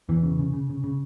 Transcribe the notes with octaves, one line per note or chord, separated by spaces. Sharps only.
E2 E3
C#3
C#3
C#3
C#3
C#3